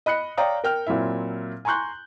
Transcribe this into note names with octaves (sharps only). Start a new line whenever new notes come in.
D#5 B5 F#6 C#7
C#5 D5 F5 G5 A#5 D#6
A#4 G5 F6
A#2 F#3 C4 E4 E5
G#5 A#5 C6 C#6 F#6 G6